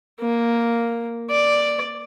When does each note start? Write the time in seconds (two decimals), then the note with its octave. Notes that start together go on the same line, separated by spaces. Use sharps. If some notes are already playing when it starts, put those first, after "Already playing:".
0.21 A#3
1.31 D5